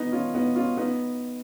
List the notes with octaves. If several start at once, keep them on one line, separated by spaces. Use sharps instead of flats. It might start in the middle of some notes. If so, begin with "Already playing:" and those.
Already playing: B3 D#4
C#4 F4
B3 D#4
C#4 F4
B3 D#4